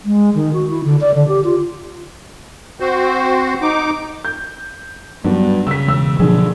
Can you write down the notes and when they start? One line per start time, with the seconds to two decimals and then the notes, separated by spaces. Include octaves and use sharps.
0.05 G#3
0.35 D#3
0.53 F#4
0.70 E4
0.84 D3
1.01 D5
1.15 D3
1.28 G4
1.44 F4
2.80 C4 F#4 C5
3.62 D#4 D6
4.25 G6
5.24 G2 F#3 B3 D4
5.67 C#3 E6 B6
5.87 E1 E6
6.20 B2 D3 F3 F#3 D4 G#4